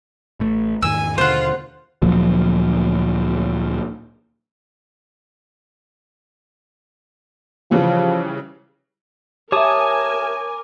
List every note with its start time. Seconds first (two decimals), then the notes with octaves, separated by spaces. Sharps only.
0.40 A1 A3
0.82 E2 G#2 D#3 G#5 E6
1.18 D#2 B2 D3 F4 C5 F#5
2.02 D2 A#2 F3 F#3
7.71 C#3 E3 F3 G3
9.52 G4 A#4 C#5 E5 G#5 A5 D6 D#6